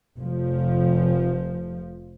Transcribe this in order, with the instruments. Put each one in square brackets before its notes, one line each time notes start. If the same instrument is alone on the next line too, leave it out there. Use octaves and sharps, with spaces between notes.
[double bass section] F1 F3